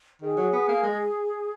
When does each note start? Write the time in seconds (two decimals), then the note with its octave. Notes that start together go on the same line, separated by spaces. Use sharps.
0.21 D#3 G#4
0.37 F#3
0.53 B3
0.68 A#3
0.83 G#3